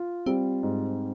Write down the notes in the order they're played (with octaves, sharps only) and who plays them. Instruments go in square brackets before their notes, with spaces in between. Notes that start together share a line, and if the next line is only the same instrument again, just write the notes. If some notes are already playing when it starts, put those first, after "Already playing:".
Already playing: [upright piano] F4
[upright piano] G3 [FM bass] C4
[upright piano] G#2